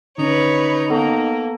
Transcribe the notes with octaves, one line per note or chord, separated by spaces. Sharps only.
D3 C#4 D#4 B4 C#5
A#3 B3 A4